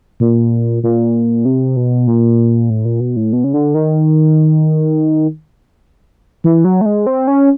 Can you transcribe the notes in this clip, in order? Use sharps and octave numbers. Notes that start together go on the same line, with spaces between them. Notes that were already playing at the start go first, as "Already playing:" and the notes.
A#2
A#2
C3
B2
A#2
A2
A#2
B2
A2
B2
C#3
D3
D#3
E3
F#3
A3
G#3
C4
C#4